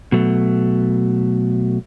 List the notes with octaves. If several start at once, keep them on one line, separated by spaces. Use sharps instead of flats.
B2 F#3 A3